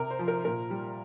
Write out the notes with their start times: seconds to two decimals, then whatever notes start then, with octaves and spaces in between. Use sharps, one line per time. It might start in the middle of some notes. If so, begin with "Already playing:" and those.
Already playing: C3 A#4
0.10 C5
0.19 F3
0.28 A#4
0.45 A#2 A#4
0.70 G3